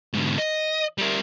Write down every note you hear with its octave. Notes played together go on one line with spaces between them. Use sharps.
G#2 D3
D#5
G3 A#4